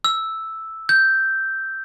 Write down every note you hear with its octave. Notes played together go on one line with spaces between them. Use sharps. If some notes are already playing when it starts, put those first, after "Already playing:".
E6
G6